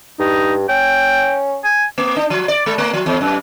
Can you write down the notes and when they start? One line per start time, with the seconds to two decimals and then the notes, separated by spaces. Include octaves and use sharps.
0.20 G2 D#4
0.69 C#4 G5
1.64 G#5
1.98 A#3
2.16 D4
2.30 F3
2.48 D5
2.66 G#3
2.78 A3
2.94 F3
3.06 E2
3.21 F#2